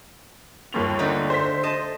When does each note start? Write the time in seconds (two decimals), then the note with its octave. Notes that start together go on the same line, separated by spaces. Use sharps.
0.73 G1 D#2 F7
0.99 D3 A3 D#4
1.30 C5 B6
1.63 D#5 A5